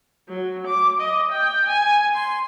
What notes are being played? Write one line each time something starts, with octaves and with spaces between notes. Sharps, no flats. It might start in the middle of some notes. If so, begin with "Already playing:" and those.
F#3
D6
D#5
G5
G#5
C6